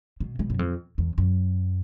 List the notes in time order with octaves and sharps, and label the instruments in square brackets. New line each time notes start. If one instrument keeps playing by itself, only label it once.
[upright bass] B2
B2
F#2
F2
E2
F#2